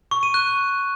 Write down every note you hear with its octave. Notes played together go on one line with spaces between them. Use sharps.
C#6
D#7
F#6